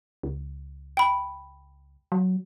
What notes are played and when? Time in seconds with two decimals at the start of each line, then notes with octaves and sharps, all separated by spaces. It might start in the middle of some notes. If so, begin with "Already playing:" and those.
0.23 C#2
0.97 G5 B5
2.12 F#3